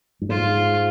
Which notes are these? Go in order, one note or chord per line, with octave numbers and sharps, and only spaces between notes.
G2
G#2 F4